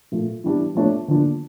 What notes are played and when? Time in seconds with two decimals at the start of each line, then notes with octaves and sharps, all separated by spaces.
0.12 A#2 F3 A3
0.44 E3 G3 D4
0.75 F3 A3 D4 A4 C#5
1.08 D3 F3 A#3 D4